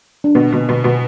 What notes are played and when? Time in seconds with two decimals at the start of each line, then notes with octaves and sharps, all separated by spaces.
0.24 D4
0.35 B2 B3
0.52 B2
0.69 B2
0.84 B2